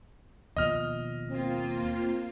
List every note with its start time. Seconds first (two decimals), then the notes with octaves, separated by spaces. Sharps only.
0.57 D#2 B2 F3 D#5 F6
1.31 A#3 C4 F4